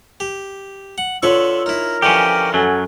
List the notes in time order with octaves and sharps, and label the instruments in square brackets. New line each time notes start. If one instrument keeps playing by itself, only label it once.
[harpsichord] G4
F#5
[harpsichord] D3 B4 C#6 [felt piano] F4 C#5 [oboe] E6
[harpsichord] D#4 E4 [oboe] A#4
[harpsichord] D3 E3 F3 [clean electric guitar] C#4 G4
[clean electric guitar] F#2 F#3 [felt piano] A4 [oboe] G#5